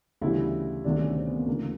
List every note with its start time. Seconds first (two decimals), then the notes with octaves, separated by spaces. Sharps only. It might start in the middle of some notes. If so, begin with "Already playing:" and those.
0.21 D2 C#3 E3 G3 E4
0.84 D2 C3 D#3 G3 D4
1.00 C#4
1.16 C4
1.27 B3
1.37 A#3
1.47 D2 C#3 E3 A#3